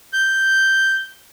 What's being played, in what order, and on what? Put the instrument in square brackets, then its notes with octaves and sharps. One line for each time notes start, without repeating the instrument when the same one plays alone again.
[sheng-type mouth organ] G6